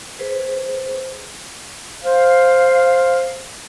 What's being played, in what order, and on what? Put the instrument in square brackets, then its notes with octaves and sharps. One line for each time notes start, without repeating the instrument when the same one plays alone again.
[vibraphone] G#4 B4 C5
[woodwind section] C5 F5